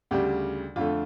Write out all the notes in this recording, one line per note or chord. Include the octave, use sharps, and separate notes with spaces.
D2 C#3 G3 G4
F2 D3 A3 F4